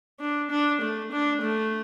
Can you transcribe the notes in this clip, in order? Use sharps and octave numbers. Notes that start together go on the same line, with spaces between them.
D4
D4
A3
D4
A3